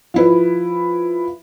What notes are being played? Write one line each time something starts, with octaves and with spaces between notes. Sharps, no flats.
F3 E4 B4